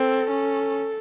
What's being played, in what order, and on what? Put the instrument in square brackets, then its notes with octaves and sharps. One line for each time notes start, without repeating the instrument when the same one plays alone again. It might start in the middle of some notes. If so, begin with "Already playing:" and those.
Already playing: [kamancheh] C4 [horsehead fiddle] A4
[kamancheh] C#4